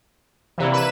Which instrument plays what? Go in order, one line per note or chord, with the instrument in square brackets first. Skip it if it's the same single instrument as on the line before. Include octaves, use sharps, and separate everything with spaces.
[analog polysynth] C3 E3 [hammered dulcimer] G3 A#3 E4
[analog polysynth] B4 E7